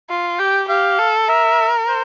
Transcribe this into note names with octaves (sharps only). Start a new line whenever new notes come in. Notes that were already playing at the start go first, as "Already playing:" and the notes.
F4
G4 G5
G4 F5
A4
A#4 E5
C5